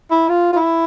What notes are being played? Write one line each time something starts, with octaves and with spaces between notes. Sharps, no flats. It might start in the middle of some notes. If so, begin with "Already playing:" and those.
E4
F4
F4
E4